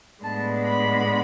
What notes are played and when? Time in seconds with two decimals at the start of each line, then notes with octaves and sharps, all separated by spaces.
0.22 A2 G#3 B3 D4 A5
0.63 B5